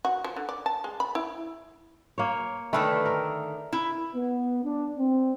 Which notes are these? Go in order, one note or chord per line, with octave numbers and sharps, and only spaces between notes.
F#4
F3
D3
D5
A5
G#3
B5
E4
A#3 C#5
D3 D#3 A3 B4 E5 G5
A#4
E4
B3
D4
C4